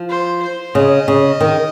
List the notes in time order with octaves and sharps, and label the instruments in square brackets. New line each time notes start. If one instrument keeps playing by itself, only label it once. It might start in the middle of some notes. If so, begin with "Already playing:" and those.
Already playing: [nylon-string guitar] F3
[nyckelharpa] C5
C5
[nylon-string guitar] C#3 [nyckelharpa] D#5
[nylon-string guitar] C#3
D#3